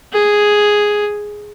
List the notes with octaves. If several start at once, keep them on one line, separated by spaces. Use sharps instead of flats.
G#4